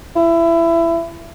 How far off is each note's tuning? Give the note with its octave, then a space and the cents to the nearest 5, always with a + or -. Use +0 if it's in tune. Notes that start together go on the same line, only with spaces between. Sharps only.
E4 +20